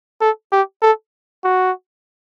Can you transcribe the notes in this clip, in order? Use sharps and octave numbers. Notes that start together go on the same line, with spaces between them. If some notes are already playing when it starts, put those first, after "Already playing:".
A4
G4
A4
F#4